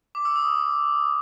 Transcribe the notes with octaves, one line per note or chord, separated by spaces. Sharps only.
D6
E6
D#6